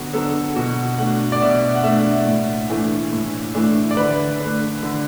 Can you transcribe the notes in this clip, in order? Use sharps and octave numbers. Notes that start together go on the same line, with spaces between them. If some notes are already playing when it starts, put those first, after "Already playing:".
Already playing: D3 F#3 B3 D4 F#4
F#3 B3 D4 A4
B2 F#4
A3 D4 F#5
D5
B2 E5
F#5
A3 D4 E5
A2
E3 A3 D4
A2
E3 A3 D4
D5
D3 B4
A3 D4
D3